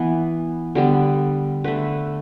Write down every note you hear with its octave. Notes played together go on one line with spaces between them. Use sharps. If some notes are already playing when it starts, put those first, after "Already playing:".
Already playing: E3 B3
D3 G3 B3
D3 A3 B4